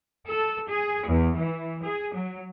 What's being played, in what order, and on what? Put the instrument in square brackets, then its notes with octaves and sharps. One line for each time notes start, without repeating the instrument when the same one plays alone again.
[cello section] A4
G#4
E2
E3
G#4
F#3